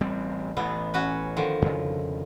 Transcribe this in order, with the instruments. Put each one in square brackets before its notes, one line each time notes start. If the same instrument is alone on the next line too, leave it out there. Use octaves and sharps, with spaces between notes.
[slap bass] A1 G3 C4
[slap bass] A1 E3 A3 [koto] B3
[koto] C#4 F#4 B4
D3 D#3 F3
[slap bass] F2 C#3